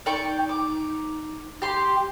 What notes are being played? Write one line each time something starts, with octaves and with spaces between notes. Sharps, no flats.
D#4 D5 G5 C#6
D6
G4 C6